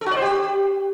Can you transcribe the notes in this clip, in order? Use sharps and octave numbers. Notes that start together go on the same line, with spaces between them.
A4
F#4
D5
C5
G4